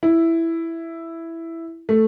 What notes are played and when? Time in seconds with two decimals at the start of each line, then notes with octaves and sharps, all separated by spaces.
0.03 E4
1.89 A3